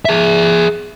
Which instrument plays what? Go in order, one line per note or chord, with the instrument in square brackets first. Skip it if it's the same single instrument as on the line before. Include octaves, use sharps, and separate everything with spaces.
[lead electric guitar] G#4 E5